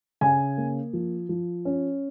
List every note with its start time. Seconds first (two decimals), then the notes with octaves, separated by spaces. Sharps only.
0.21 C#3 G#5
0.57 A#3
0.93 F3
1.29 F3
1.65 C#4